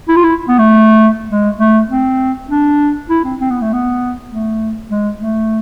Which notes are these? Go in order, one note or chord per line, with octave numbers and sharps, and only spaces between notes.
E4
F4
E4
B3
A3
G#3
A3
C4
D4
E4
C4
C4
B3
A3
B3
A3
G#3
A3